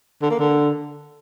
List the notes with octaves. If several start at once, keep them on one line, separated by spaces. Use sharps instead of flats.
D3
A#3
D3